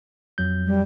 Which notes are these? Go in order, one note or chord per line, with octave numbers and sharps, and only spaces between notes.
F2 F#3 G6
G3